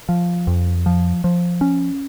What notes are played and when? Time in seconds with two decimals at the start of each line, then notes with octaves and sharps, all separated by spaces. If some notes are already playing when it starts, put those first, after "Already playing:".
0.09 F3
0.47 F2
0.86 F3
1.24 F3
1.61 C#4